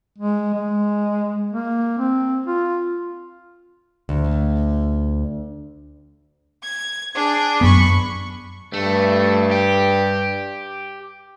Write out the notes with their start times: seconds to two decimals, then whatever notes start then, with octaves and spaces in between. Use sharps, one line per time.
0.18 G#3
0.54 G#3
1.53 A#3
1.98 C4
2.47 F4
4.09 D2
6.62 G#6
7.15 D4 G#4
7.61 F#2 B3 B5 C#6
8.73 G2 A3
9.51 G4